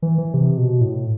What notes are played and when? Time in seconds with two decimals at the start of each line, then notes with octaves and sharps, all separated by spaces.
0.02 E3
0.18 E3
0.34 C3
0.57 B2
0.81 A2